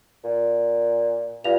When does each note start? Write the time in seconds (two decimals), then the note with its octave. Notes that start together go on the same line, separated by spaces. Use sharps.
0.25 A#2
1.44 G2 F4 F5 F7